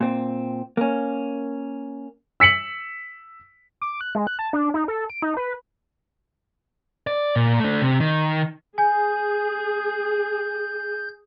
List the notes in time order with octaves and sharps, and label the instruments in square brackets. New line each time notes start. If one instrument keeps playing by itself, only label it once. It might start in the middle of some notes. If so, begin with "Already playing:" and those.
[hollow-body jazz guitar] A#2 C4
A#3 C#4
[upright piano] E6 B6 C#7 F#7
[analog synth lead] D6
F#6
G#3
F#6
A5
D4
D#4
A4
D7
D#4
B4
[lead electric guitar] D5
A#2
A3 D4
C3
D#3
[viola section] G#4 [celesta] G#5 [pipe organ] G6